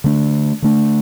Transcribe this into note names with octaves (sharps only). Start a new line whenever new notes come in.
D3 A3 D4
D3 A3 D4